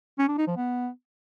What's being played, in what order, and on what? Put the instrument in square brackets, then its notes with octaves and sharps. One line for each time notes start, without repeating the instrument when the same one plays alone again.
[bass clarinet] C#4
D4
D#4
F3
B3